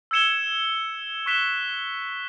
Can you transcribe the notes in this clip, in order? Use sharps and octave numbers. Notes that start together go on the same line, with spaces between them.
E6 G#6 C#7 E7 G7
C#6 F#6 B6 E7 G7